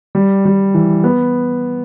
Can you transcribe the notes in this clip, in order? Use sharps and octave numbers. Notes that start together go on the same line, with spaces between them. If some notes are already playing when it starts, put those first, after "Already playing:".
G3
G3
E3
B3